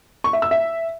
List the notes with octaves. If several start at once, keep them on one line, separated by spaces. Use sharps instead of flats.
C#6
E5
E6
E5